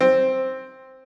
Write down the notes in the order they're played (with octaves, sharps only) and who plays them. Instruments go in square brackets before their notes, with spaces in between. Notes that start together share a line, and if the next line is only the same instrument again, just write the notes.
[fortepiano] C4